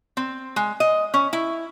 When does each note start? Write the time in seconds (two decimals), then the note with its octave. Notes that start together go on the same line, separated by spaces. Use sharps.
0.17 C4
0.56 G#3
0.80 D#5
1.14 C#4
1.33 E4